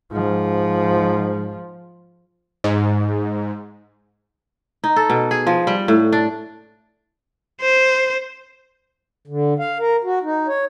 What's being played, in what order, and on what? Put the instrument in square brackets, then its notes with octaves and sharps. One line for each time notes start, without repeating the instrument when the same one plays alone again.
[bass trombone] G#2 [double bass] F3
[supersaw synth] G#2
[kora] D#4
A4
B2
G#4
F3
G3
A2
D4
[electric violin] C5
[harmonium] D3
F5
A#4
F#4
D#4
C#5